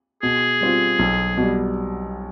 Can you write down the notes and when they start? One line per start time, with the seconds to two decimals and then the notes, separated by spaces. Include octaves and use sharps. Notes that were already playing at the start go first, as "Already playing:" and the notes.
0.23 B2 G#4
0.61 G3 C4 F4
0.99 B1
1.38 B2 G3